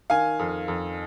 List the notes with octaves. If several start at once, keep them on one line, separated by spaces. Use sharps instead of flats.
D#3 F5 G#5
F2
F2